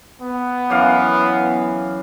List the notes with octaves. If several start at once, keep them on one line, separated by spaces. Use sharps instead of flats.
B3
F#2 E3 F5